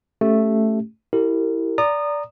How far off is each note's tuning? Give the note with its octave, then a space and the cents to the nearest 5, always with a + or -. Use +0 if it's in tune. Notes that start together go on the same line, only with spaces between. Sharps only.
A3 +0 C#4 +0 G4 +0
E4 +0 G4 -10 A#4 -30
D5 -10 A#5 -10 D#6 -25